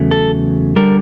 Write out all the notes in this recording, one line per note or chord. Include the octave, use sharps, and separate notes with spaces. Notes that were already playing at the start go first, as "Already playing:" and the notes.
Already playing: E2 C#3 F#3 A3
A4
D3 G3 A#4